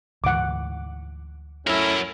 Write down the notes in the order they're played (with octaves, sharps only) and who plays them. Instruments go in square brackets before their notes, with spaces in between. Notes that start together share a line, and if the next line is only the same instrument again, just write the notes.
[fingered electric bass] D2 G#2 E3 [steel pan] F#5 D6
[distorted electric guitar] F#3 A#4 [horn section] A3 C#4 E4